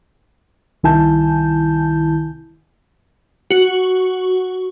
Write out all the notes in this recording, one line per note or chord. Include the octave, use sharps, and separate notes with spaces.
C2 D#3 E4 G#5 A5 G6
F#4